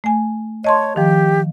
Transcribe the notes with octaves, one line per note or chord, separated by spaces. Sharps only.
A3 G#5
C#5 D#5 A5 C6
D#3 F3 G4